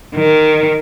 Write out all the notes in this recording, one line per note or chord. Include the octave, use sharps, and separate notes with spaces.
D#3